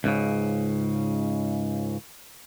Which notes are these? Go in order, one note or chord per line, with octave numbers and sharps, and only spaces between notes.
C#2 G#2 C#3